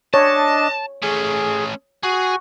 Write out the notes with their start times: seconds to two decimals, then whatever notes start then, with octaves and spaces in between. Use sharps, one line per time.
0.14 D4 C#5 D#5 A5
1.02 A3 C#4 G#4
2.03 F#4 G#4